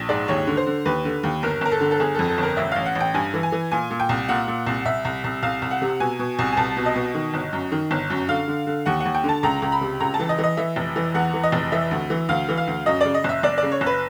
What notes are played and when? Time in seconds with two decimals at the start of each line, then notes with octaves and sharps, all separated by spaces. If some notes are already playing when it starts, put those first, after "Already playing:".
Already playing: A#1
0.09 G#2 D5
0.28 D#2 C#5
0.47 D3
0.57 C5
0.67 D3
0.85 D#2 B4
1.05 D3
1.23 D#2
1.43 G1 A#4
1.61 G1 A#4
1.71 A4
1.81 D3
1.91 A4
2.00 G1 G#4
2.15 F2 A4
2.28 A4
2.38 G1
2.43 A#4
2.57 A1 E5
2.72 A1 F5
2.86 F#5
2.95 A1
3.00 G5
3.14 G2 G#5
3.34 E3
3.43 G#5
3.52 E3
3.71 A#2 G#5
3.90 A#2
4.00 G5
4.09 C2
4.29 A#2 F#5
4.48 A#2
4.66 C2
4.85 C2 E5
5.05 C2
5.24 C2
5.43 C2 F5
5.62 C2
5.71 F#5
5.82 C3
6.00 B2 G#5
6.19 B2
6.39 C2
6.52 G#5
6.57 C2 A5
6.77 B2
6.86 D#5
6.96 B2
7.15 D#3
7.34 G1
7.53 F#2
7.72 D#3
7.91 G1
8.10 F#2
8.29 D3 F5
8.48 D3
8.67 D3
8.86 D#2 F#5
9.00 D#2 F#5
9.15 G5
9.24 D3
9.29 A5
9.43 C#2 A#5
9.62 C#2
9.72 B5
9.81 C3
10.00 C#2 A#5
10.14 A5
10.19 E3
10.29 D#5
10.38 E3
10.44 D#5
10.57 E3 E5
10.76 F1
10.96 E3
11.14 E2 F#5
11.34 E3
11.43 D#5
11.52 F1
11.72 E3 E5
11.91 D2
12.10 E3
12.29 D2 F5
12.49 E3
12.57 F5
12.67 D2
12.86 F#2 D#5
13.01 C#3 D5
13.14 D#5
13.24 F#1 E5
13.43 F#1 D5
13.58 C#3 D5
13.72 C#5
13.81 F#1
13.86 B4